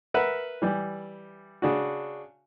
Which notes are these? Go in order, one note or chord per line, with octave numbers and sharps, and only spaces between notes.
A#4 B4 E5 F#5
E3 G3
C#3 D4 F#4